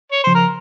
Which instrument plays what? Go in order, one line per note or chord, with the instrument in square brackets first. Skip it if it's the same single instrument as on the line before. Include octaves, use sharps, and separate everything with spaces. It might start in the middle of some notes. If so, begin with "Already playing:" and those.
[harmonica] C#5
[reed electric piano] C#3 F3 [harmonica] C5
[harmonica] A#4